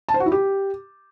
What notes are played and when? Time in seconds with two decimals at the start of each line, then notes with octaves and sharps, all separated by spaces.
0.09 A5
0.14 C5
0.20 F#4
0.26 E4
0.32 G4